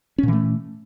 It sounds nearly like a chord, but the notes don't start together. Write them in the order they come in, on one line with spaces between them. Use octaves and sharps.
C#4 A#2 E3 A3